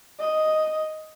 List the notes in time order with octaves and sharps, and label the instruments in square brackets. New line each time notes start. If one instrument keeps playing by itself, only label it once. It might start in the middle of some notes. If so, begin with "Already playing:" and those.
[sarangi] D#5